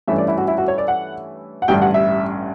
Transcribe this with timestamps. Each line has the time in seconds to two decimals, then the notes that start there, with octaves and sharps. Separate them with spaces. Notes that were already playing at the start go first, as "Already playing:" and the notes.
0.08 G2 E3 A3 C#4 E4 E5
0.18 D5
0.28 E4
0.38 F#4
0.48 E4
0.58 F#4
0.68 C#5
0.78 D5
0.88 F#5
1.62 F#5
1.68 A1 G2 D3 G5
1.82 F#5
1.94 E5